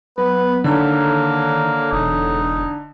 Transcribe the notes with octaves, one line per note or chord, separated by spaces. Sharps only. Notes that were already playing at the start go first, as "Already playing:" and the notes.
F#3 B3 B4
D3 D#3 A#3 A4 C#5 A#5
E1 D#4